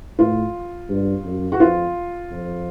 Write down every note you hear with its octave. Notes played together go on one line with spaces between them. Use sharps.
A2 F4
G2
F#2
F#4
F2 F4
F2